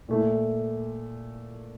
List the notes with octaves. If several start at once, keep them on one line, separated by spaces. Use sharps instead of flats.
A#2 A3 E4